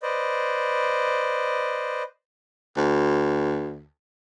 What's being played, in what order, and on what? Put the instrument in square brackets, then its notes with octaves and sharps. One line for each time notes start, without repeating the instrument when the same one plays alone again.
[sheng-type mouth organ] B4 C5 D5 D#5
[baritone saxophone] D2